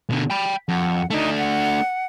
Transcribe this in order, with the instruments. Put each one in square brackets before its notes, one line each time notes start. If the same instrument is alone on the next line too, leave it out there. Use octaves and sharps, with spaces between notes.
[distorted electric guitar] B2 D3
G5 B5
[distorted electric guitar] F2 [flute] F#5
[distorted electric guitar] A3 D4 [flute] D#4
[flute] F#5